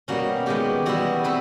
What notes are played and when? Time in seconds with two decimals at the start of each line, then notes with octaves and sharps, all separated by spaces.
0.08 B2 G3 A#3 C#4 F#4
0.46 D#3 G#3 B3 G4
0.86 E3 G3 B3 F#4
1.24 A3 C4 B4